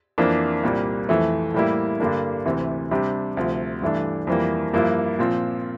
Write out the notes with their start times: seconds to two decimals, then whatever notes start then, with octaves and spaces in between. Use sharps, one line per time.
0.18 F2 E3 A#3 D4
0.63 C2 A#2 G3 A#3
1.09 F2 E3 A3
1.54 A2 G3 A#3 E4
2.00 G2 D3 G3 A#3 D4
2.46 D2 C3 E3
2.91 C3 G3 D4
3.37 D2 C3 F3
3.82 G2 E3 A3 D4
4.27 F2 E3 G3 A#3
4.73 G2 F3 A#3 E4
5.19 A#2 F3 C4